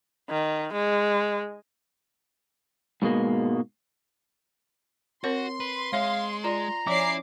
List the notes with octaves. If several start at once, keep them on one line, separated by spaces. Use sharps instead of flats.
D#3
G#3
G#2 B2 G#3 A#3
C4 F#4 A#4 C#5 C6
B4
G#3 C#5 E5 F5
F4 D5 A#5
F3 C#4 E4 D5 D6 C7